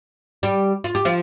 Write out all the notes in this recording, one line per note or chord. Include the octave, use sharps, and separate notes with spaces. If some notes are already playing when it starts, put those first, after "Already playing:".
G3 G4
F4
G4
F3 F4